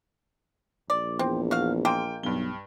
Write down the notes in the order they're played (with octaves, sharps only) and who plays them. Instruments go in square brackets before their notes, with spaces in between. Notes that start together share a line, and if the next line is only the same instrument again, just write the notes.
[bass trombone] A#1 [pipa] D5
[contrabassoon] E2 [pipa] C4
[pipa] F#4 F5
[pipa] G#3 A#3 F4 [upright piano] G5
[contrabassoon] B1 [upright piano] G2 G7